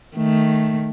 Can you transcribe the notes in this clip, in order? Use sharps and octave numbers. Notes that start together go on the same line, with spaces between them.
D#3 A3